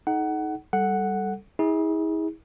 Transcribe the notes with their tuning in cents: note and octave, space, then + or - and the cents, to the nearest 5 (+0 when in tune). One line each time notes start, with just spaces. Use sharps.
D#4 +10 A4 -45 F#5 +20
G3 +0 A4 +0 F#5 +0
E4 -45 G#4 -20